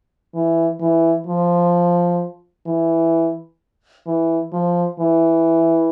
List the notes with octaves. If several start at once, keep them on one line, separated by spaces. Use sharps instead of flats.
E3
E3
F3
E3
E3
F3
E3